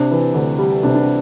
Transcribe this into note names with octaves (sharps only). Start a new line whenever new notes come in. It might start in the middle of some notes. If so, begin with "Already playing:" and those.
Already playing: C3 D4
E3
D2
G3
C3 D4
D4